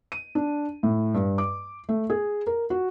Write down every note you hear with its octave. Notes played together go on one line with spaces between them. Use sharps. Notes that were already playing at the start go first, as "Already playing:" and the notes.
D#7
D4
A2
G2
D6
A3
G#4
A#4
F#4